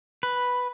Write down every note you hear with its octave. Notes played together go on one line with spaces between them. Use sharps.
B4